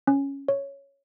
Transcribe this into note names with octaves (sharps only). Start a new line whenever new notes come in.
C#4
C#5